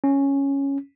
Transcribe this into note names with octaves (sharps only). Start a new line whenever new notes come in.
C#4